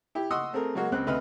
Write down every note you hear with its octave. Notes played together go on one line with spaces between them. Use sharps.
E4 G4
D#5 F#5 C6 C#6 D#6 E6
A3 C4 G#4 A#4
F#3 G#3 A#3 F#4
C#2 C4 F#6
D2 C3 B4 D#5 E5 F6